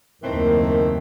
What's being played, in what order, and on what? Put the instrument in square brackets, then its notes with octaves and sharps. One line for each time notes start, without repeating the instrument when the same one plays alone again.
[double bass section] F#1 D#2 [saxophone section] A2 E3 C4 [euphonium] D#3 [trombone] A#4